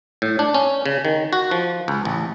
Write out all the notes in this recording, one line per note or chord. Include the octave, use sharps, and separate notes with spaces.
A2
D4
C#4
C#3
D#3
F#4
F3
C#2
A1